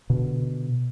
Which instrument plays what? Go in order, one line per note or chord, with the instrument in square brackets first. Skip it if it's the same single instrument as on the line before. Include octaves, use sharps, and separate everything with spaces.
[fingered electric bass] B2 D3